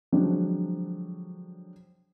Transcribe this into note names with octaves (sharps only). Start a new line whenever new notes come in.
D3 F3 F#3 G#3 C4 D4